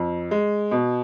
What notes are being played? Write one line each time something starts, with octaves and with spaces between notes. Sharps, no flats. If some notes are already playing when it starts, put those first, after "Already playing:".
Already playing: F2
G#3
B2